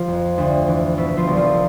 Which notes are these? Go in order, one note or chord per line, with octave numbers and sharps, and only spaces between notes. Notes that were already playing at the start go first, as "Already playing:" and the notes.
Already playing: F3 F4
F2
D2
E3
B2 E4
F3 F4
C2
F3 F4